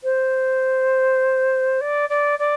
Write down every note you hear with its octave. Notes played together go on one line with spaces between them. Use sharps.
C5
D5
D5
D5